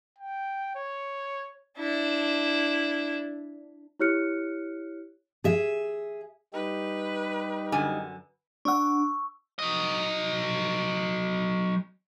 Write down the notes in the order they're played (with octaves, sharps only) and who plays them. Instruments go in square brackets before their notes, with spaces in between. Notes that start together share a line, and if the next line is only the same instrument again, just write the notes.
[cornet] G5
C#5
[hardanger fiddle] D4 E4
[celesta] E4 G4 C#5 F6 F#6 C#7
[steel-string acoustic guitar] G#4 E5
[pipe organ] G3 D#4 G4 [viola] B4
[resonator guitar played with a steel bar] F#2 D3 G#5
[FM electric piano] D4 F#5 [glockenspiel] C#6 E6
[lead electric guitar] F#3 D#5